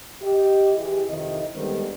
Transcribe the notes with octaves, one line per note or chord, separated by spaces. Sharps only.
G4 D#5
E3 G4 G#4
F2 C3 D#3 E4 D#5
D3 D#3 G3 G#3 B3 C4